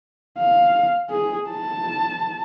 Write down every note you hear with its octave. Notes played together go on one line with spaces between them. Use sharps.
F5
G#4
A5